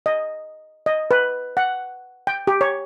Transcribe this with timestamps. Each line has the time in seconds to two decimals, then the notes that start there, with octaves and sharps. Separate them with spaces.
0.06 D#5
0.86 D#5
1.11 B4
1.57 F#5
2.27 G5
2.47 G4
2.61 C#5